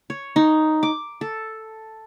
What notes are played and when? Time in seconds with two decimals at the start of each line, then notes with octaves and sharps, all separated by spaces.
0.10 C#5
0.36 D#4
0.83 D6
1.21 A4